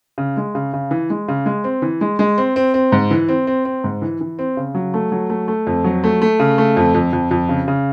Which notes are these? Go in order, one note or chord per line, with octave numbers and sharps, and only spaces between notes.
C#3
G#3
C#3
C#3
E3
G#3
C#3
G#3
C4
E3
G#3
G#3
C4
C4
C4
G#2
E3
C4
C4
C4
G#2
E3
E3
C4
C#3
F#3
A3
F#3
A3
A3
F2
F#3
A3
A3
C#3
A3
F2
F2
F2
F2
C#3
C#3